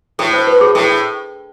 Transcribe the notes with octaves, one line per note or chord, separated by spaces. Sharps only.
A2 A4
C5
B4
G#4
A2 A4